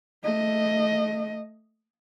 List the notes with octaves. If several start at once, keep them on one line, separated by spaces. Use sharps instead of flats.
A3 D#5